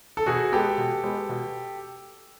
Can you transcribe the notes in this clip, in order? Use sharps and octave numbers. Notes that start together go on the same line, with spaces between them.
A4
B2 F#4 G#4
G#3 B3 G4 A4
B2
G#3 B3
B2